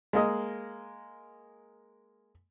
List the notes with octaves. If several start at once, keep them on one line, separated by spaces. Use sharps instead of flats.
G#3 A#3 D#5